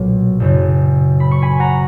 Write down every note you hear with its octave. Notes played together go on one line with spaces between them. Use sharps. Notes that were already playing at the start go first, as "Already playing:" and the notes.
Already playing: B1 A#2 F#3
F#1 F#2 C#3
B5
C#6
G#5 B5
F#5 A#5